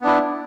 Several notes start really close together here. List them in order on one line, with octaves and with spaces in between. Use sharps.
B3 D4 E4